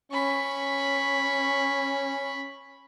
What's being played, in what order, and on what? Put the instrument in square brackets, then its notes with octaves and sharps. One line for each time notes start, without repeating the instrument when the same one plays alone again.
[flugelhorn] C#4 [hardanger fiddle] B5 C#6